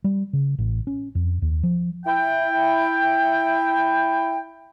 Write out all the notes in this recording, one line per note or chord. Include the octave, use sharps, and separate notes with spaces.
G3
C#3
A1
C#4
F2
D#2
F3
E4 G5